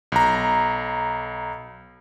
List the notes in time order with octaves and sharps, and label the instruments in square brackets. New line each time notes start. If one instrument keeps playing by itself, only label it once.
[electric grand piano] B1 A#5